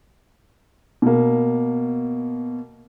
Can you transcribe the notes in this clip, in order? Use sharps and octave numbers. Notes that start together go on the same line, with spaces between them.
B2 A#3